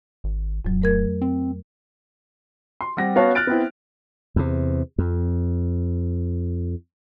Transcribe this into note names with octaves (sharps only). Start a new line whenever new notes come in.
G#1
D1 F2 F#3
A3 A#4 G#6
C4
C6
G3 C4 F#5 A#6
B3 C#4 F#4 C#5 F5 A5
F6 F#6 A6 D7
B3 C4 E4
E2 C3
F2